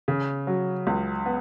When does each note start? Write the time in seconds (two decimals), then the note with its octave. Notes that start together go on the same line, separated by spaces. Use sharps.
0.08 C#3
0.47 F#3
0.87 C#2
1.26 B3